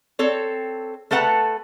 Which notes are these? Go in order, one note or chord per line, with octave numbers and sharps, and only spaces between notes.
C4 A4 C#5
A3 A4 B4 F#5 A5 A#5